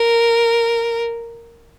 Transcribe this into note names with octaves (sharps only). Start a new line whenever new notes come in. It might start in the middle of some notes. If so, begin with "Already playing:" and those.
Already playing: A#4